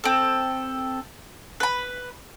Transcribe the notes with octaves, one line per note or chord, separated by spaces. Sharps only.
C4 A4
B4 B5